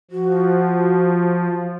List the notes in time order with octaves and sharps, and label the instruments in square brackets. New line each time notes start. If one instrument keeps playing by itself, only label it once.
[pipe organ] F3 [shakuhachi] F#4